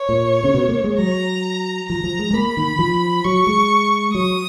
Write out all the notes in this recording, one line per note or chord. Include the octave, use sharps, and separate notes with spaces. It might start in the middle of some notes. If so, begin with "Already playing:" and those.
Already playing: C#5
A#2
C#3
B2
A#3
G#3
F#3 A#5
F3 A#5
F3
G#3
G#3
A#3 B5
D#3
F3
F#3 C#6
G#3
F#3 D#6